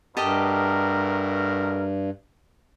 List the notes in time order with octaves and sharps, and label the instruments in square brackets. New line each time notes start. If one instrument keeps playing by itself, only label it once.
[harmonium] G2 [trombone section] B2 A3 A#4 [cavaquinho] G4 D#5 A5